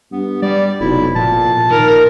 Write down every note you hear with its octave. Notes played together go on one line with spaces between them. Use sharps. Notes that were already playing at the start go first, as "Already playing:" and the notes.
G2 B3
G3 D5
F1 B1 E4
A#2 F3 A5
A#2 D#3 A#4